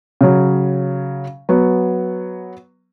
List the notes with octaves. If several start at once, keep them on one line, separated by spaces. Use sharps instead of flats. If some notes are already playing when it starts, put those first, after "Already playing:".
C#3 F#3
F#3 B3